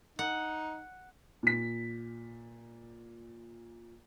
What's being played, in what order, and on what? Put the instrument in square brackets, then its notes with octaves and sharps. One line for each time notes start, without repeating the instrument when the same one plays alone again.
[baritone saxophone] D#4 [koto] F#5
[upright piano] A#2 B6